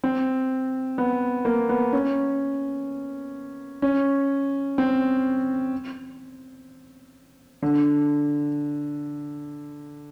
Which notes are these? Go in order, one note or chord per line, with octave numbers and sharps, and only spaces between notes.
C4
B3
A#3
B3
C#4
C#4
C4
D3